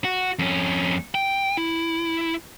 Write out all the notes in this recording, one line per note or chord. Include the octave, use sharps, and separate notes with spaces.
F#4
F2 C#4
G5
E4